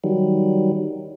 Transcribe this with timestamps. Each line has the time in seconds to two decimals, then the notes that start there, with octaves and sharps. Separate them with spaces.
0.04 D#3 F#3 G3